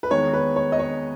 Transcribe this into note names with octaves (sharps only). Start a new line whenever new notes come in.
B4
E2 D#3 G#3 B3 C#5
B4
C#5
D#5
C#5